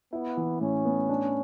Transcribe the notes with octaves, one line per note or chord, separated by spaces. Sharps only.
B3 E4
E3
A2 C#4
B3
D4